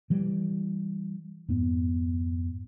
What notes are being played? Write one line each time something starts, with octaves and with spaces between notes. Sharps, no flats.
E3 G3
F2 G#2 B3